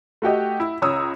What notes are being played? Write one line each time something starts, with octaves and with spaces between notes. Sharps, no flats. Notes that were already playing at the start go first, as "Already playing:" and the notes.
A3 F#4 G4 D#5
E4
C#2 C#5 A#5 D#6 E6